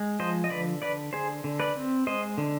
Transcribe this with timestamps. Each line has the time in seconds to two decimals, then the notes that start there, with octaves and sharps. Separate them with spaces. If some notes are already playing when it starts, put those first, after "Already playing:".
Already playing: G#3
0.19 F3 C5 D#5
0.44 D#5
0.50 D3 B4 D5
0.82 D3 B4 D5
1.13 D3 G#4 C5
1.44 D3
1.60 B4 D5
1.75 C4
2.07 G#3 C5 D#5
2.38 D3